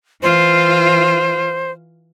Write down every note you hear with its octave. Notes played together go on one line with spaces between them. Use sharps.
E3 F4 C5